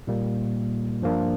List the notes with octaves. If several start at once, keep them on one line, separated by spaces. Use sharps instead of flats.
A#2 G3 A#3
G2 F3 A#3 D4